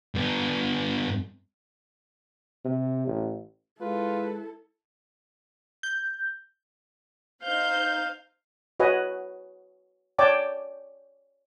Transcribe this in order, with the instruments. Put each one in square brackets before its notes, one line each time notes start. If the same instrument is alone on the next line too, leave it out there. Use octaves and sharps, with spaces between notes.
[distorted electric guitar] G2 B3
[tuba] C3
A1
[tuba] G#3 [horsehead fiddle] E4 A4 [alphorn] F4 [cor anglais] B4
[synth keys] G6
[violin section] D#4 C5 G6 [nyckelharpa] F5
[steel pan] F#4 B4 C#5 D#5 F#5 G#5
C#5 D5 G5 A5 D6